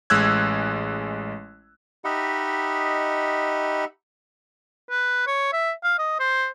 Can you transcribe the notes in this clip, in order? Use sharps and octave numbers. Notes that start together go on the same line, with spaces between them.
A1 G#3 E6 F#6 G#6
D#4 G4 D#5 E5 F#5 B5
B4
C#5
E5
F5
D#5
C5